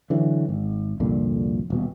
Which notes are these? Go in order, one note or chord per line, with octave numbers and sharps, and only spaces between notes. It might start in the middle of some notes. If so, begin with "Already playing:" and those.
D3 E3 F#3
G#1
C2 F2 A#2 D3
D#1 B2